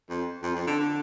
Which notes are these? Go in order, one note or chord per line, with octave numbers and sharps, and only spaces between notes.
F2
F2
F2
D3
D3